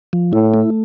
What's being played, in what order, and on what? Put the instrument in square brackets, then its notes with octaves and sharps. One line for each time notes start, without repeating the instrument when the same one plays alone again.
[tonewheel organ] F3
[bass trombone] A2 [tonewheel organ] E4
[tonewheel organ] A3